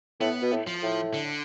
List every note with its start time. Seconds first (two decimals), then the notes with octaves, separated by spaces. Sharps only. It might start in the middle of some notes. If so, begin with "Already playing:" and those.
0.21 A2 B3
0.41 B2
0.52 A2
0.67 F3
0.82 A2
1.14 D3